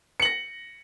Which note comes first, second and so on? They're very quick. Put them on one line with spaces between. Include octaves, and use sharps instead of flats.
C#7 F#7 A#6